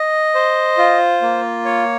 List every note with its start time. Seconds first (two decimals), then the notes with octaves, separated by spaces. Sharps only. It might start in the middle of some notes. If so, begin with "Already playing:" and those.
Already playing: D#5
0.35 C5
0.78 F4
1.22 A#3
1.65 C#5